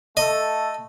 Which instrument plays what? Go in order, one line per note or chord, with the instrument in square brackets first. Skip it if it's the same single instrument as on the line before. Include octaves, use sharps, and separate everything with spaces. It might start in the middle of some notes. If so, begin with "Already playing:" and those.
[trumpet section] A3 A4 [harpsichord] D#5